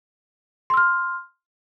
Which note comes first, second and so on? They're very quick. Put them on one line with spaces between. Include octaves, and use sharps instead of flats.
C6 E6 F6